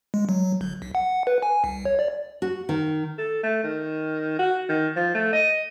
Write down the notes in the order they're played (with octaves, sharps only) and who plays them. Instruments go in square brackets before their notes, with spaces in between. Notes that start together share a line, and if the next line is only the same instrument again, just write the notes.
[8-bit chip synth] G#3
F#3
G1
B1
F#5
B4
G#5
C2
C#5
D5
[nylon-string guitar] F#4
D#3
[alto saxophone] A4
A3
D#3
F#4
D#3
F3
A3
D#5